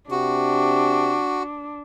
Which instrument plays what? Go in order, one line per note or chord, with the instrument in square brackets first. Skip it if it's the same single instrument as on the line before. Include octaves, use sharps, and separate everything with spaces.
[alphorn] C3 [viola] D4 [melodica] F#4